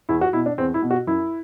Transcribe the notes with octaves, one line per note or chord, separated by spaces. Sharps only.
E2 E4
F#4
B2 E4
D4
E2 C4
E4
B2
F#4
F#2 E4